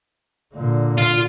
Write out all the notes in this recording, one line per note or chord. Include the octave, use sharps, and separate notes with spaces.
A#2 D3
F4